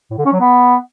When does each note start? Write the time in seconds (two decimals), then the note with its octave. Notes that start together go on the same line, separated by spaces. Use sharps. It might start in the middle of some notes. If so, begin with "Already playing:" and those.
0.10 A2
0.18 D3
0.25 C#4
0.33 F#3
0.40 B3